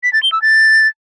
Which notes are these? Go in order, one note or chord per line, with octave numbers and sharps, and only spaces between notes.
B6
A6
G7
E6
A6